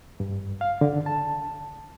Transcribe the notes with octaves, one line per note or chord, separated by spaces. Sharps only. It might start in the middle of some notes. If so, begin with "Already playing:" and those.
G2
F5
D3
A5